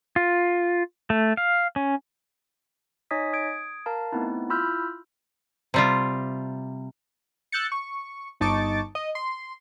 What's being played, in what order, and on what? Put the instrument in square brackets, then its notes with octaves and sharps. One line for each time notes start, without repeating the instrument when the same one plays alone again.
[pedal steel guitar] F4
A3
F5
C#4
[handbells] D#4 C#5 D#5 G#5 D#6 B6
D#6 G#6 D7
A#4 F5 A5 A#5
A3 B3 C4 D#4 E4
E4 F4 B5 E6 F6 G6
[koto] C3 G3 F4
[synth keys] E6 F#6 G6 A6 C#7
C#6
G1 D#4 A5 C#6 D6 A6
D#5
C6